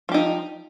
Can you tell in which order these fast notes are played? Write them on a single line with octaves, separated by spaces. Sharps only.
F3 G4 D#4